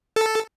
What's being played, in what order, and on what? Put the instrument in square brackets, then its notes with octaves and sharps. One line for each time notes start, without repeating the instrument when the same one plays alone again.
[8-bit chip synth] A4